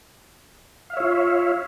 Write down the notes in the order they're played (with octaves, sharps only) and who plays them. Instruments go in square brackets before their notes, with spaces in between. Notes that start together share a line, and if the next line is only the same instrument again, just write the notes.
[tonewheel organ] F5
E5
C#5
F4